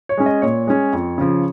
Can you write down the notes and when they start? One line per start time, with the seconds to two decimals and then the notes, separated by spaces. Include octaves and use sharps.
0.09 C#5
0.17 G#3 C#4
0.26 D#5
0.42 A#2 C#5
0.67 G#3 C#4
0.93 F2
1.18 C#3 F3